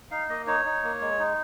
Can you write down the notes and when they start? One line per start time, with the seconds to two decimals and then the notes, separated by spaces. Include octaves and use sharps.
0.11 D#4 F5
0.29 A#3 D#5
0.47 D#4 C#5
0.65 D#4
0.83 A#3
1.01 G#3
1.19 D#4